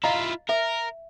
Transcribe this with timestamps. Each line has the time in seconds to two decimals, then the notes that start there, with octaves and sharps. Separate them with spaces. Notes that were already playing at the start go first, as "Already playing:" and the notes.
0.04 E4 F4 D#5 F5 A#5
0.49 A#4 E5